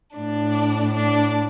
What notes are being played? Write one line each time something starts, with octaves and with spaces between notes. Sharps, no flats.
A2 D4
D4